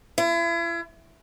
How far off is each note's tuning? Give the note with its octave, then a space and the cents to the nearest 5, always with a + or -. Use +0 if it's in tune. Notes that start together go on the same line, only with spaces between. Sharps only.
E4 +40